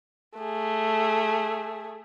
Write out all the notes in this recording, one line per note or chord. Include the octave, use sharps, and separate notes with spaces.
A3 G#4